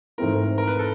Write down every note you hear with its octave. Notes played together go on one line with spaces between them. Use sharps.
G#2 E3 A3 C4 E4 A#4
A#4
B4
A4